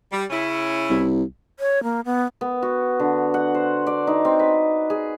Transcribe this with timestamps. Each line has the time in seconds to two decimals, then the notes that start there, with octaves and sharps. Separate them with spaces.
0.12 G3
0.31 C#3 C#4 E4
0.90 C2
1.60 C#5
1.83 A#3
2.05 B3
2.41 B3
2.62 F#4
3.00 D3
3.34 F#5
3.54 C5
3.87 D5
4.07 D#4
4.25 C4
4.39 B4
4.90 G#4